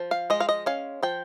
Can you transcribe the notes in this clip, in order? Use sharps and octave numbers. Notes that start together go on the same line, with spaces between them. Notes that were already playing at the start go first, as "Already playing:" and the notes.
Already playing: F3
F5
G#3 D#5
F5
D#5
C#4 F5
F3 G5